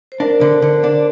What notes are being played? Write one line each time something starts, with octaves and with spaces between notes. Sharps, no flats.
C5
D4 A#4
D3
D3
D4